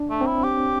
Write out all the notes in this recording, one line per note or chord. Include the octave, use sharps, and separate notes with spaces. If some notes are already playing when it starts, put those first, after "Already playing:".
Already playing: D4
A3
C4
E4
G4